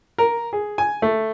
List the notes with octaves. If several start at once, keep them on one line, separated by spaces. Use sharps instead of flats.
A#4
G#4
G#5
A3